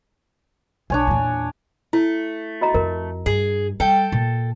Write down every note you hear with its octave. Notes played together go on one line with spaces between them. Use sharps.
B1 D4 C#5 G#5
E2 A#2
A3 E4
F#4 D#5 A#5
F2 A#4
G2 G#4
G3 A4 G5
A#2